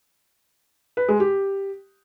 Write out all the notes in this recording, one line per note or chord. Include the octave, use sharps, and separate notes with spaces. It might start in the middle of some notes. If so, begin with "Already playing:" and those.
B4
G#3
G4